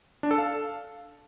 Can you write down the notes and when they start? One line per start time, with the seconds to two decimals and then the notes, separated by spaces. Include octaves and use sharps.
0.23 D4
0.31 A4
0.38 F5